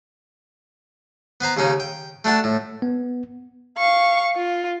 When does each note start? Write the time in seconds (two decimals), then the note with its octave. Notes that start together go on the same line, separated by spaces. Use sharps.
1.41 B3 B4 C5 A#5
1.57 D#2 C#3 C#4 D#4
1.80 G5
2.24 A3 D4 F#4 A5
2.44 A2
2.82 B3
3.78 F5 C#6
4.36 F4